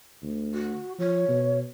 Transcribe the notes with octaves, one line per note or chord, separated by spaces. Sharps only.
D2
F#4
F3 C#5
B2